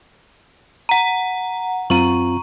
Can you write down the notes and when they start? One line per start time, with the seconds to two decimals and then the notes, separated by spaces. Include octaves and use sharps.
0.89 F#5 A#5
1.90 F#2 C4 F4 A#5 C#6